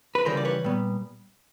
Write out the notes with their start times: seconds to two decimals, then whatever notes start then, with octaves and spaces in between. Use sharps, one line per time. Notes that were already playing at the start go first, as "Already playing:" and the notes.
0.15 B4
0.25 C#3 E3 G3 A#4 C5
0.37 D5
0.45 B4 C#5
0.64 A#2 G3 B3